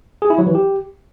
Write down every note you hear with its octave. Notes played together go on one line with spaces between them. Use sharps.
G#4
E4
F#3
E3
G4